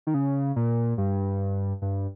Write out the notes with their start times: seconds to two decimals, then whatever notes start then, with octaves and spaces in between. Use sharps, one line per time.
0.07 D#3
0.14 C#3
0.56 A#2
0.98 G2
1.82 G2